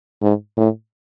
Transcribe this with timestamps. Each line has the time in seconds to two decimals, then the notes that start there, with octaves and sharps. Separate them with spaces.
0.22 G#2
0.57 A2